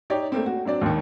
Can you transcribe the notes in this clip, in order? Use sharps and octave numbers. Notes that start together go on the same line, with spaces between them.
D#4 G4 C#5 D5
A3 A#3 C4
F#4
F#3 C4 D4 D5
D#2 G#2 D#3